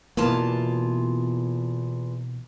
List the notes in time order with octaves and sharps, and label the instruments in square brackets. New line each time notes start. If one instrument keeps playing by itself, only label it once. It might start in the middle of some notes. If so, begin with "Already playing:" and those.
[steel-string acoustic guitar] E2 F4 A5 [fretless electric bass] B2 E3 A#3